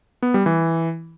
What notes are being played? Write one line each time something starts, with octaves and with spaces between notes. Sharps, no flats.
B3
G3
E3